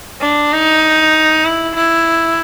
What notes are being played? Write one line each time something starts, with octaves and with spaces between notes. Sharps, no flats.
D4
D#4
E4
E4